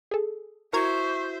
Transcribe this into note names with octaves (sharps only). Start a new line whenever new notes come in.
G#4 A4
E4 F#4 A#4 C5 E5 A#5 C#6 G#6